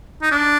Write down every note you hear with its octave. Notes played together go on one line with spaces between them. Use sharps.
D#4
D4